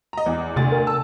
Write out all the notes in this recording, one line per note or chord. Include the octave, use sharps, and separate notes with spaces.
D#5 A#5
E2
D2 C3 A6
A#4
A5 E6